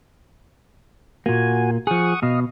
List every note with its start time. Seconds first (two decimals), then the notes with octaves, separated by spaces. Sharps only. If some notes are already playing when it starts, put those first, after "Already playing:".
1.26 A#2 A#3 F#4 G#5
1.87 F3 G#4 F#5 C#6 D#6
2.23 B2 D#5 F5